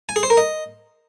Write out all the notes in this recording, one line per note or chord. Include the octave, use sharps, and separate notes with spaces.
G#5
G#4
C5
A#4
D#5